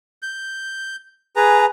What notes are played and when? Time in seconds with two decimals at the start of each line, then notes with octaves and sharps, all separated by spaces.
0.22 G6
1.36 G#4 B4 G#5 A#5